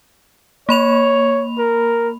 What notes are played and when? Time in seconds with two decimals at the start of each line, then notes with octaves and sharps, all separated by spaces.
0.69 A#3 C#5 B5 F7
1.58 A#4